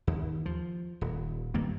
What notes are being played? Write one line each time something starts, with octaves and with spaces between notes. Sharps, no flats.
D#2
F3
D#1
G2 D#3 A#3